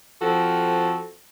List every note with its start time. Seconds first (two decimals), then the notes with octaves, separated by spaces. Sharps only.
0.22 F3 C4 F#4 A4